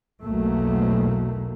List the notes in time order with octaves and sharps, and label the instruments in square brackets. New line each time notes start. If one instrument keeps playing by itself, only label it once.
[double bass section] B1 E2 B2 F#3 A3 A#3